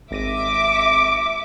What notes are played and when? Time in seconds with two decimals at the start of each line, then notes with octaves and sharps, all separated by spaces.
0.11 G#1 E5 D6 A#6 D#7